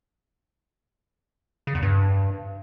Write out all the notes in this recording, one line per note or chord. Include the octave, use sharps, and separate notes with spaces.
C#3
E2
G2